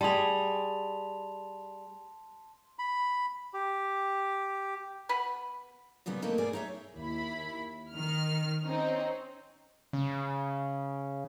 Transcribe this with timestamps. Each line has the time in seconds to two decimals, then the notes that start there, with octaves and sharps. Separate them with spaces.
0.01 G3 G#4 A5 C6 F7
2.79 B5
3.53 G4
5.09 B3 B4 B5
6.06 A#2 C#3 G3 B3
6.22 D2 A3 A#3 C4 D#4 B4
6.38 G#2 B2 G#3 G#4 D5
6.53 D#4 C#5 E5
6.96 D#2 E4 B5
7.95 D#3 F6
8.65 C4 C#4 D#4
9.93 C#3